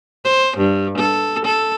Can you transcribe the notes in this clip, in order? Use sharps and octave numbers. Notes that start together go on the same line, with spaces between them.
C5
G2
A4
A4